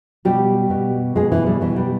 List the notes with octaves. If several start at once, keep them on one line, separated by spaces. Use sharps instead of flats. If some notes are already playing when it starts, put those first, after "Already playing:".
B2 G3 G4
B2
B2 G#3 G#4
E3 E4
G3
B2 E3
G3